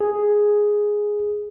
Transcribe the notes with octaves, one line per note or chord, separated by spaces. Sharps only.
G#4